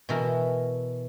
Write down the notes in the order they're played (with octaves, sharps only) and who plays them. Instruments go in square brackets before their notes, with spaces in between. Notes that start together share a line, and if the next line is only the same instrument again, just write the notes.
[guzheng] B2 E3 A#4